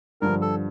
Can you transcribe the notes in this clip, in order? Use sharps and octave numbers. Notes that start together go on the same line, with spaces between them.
G2 D3 F3 A#4
A4